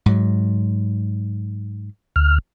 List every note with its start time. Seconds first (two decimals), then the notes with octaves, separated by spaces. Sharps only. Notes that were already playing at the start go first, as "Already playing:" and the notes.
0.06 G#2 F#3
2.16 D2 F6